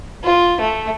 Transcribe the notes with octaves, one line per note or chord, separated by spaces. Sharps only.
F4
A3